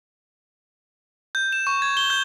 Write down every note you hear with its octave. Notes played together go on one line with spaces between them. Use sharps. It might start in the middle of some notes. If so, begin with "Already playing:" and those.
G6
E7
C#6
G#6
G7
G6